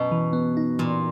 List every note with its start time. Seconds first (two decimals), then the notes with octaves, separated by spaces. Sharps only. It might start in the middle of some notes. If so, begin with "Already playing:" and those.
Already playing: F#2 B2
0.11 E3
0.33 B3
0.57 D#4
0.79 A#2 E3